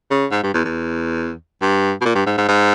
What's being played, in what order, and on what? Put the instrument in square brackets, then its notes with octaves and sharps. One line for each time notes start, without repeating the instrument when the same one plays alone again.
[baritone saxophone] C#3
G#2
G2
E2
E2
G2
B2
A#2
G2
G#2
G#2
G#2